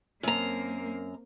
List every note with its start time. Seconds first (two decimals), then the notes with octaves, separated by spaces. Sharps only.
0.23 F#2 A#3 C4 A#5